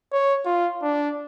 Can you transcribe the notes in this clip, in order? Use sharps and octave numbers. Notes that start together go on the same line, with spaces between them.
C#5
F4
D4